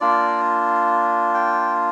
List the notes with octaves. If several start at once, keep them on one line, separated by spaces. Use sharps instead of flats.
A#3 D4 F4 D5
G5